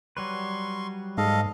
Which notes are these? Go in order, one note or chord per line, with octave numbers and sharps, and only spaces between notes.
F#3 G3 B4 C6 C#6
G#2 A4 D#5 F5